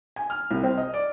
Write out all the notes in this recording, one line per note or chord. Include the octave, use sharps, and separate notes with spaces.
G#5
F6
C2
C4
D#5
D5